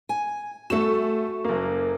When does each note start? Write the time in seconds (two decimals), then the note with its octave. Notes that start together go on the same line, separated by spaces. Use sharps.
0.09 G#5
0.70 A3 F#4 A4 E7
1.44 F#1 A#3